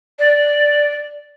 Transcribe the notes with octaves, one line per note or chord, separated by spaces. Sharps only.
D5